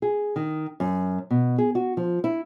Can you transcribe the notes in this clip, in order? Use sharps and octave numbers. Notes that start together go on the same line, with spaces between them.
G#4
D#3
F#2
B2
G#4
F#4
F3
E4